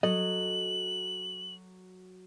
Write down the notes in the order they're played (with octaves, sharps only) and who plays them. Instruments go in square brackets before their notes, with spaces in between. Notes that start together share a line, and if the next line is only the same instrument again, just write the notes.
[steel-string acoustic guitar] F#3 [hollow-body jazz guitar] A4 D#5 [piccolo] F#7